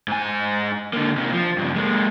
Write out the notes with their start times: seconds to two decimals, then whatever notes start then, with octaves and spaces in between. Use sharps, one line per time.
0.08 G#2 G#5
0.93 D3 A#3
1.17 C3 A#3
1.32 F3
1.58 G2 C#3
1.76 G#3 A#3